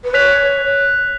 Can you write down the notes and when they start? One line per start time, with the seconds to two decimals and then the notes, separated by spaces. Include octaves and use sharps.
0.04 B4
0.14 C#5 F#6 B6 F7